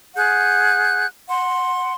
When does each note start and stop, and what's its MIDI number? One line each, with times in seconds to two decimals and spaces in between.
0.15 1.06 68
0.15 1.06 78
0.15 1.06 90
0.15 1.06 91
1.27 1.94 78
1.27 1.94 84